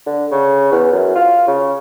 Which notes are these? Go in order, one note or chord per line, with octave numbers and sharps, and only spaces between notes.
D3
C#3
E2
F#2
F4
C#3